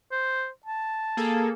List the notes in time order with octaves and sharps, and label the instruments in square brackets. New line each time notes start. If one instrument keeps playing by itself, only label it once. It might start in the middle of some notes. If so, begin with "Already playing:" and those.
[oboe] C5
A5
[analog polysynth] A#3 G#4 A4